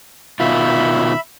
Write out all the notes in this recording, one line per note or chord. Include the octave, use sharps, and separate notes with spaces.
B2 D#3 F4 E5 B5